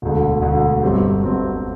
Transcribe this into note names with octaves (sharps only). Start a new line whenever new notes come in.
E1 D2 D3
E1 D2 D3
G1 G2 F#3 C4 G4
G1 G2 F#3 C4 G4